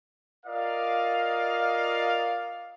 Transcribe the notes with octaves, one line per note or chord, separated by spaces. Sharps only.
F4 A#4 D5 D#5 F5